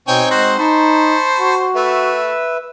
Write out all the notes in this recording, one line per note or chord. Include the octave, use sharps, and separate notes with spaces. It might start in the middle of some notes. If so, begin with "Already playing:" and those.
B2 C4 D#4 C#5 G5 G#5 G6
G#3 F#4 C5
D#4 C5 A5 B5 C#6
F#4
A3 B4 E5